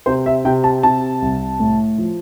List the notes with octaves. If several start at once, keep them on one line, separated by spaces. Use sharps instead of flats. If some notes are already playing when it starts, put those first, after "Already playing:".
C3 C5
E5
C3 G5
A5
C3 A5
C2
A2
F3